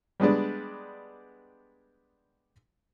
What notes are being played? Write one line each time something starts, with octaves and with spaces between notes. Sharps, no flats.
G3 G#3 B3 D4